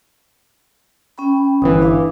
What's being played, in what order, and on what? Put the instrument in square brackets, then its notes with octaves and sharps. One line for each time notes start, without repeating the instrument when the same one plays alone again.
[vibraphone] C#4 G5 B5
[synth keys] G1 E3 [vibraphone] D#6
[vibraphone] D4 F5